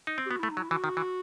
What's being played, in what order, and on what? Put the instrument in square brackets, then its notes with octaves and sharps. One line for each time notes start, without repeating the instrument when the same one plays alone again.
[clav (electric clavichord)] D#4
C4
[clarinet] G4
[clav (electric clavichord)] B3 [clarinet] F#4
[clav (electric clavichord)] A3 [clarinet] E4
[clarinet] D#4
[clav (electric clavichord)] F#3
[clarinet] E4
[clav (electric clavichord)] E3 [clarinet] F#4
[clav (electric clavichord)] D#3
E3